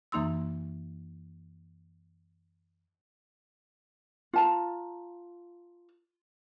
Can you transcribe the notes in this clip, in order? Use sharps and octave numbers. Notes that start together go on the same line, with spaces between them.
F#2 E3 A#3 D#4 C6 E6
F4 A5 A#5